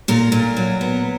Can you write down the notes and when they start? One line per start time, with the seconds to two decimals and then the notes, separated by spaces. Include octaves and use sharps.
0.08 A#2 A#4
0.32 A#2
0.57 F#3
0.81 B3